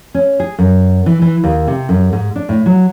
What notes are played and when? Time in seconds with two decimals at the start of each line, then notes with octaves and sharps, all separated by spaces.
0.15 C#4
0.40 G#4
0.58 F#2
1.06 E3
1.22 E3
1.44 D#2
1.68 C3
1.89 F#2
2.13 G#2
2.36 D4
2.49 A2
2.66 F#3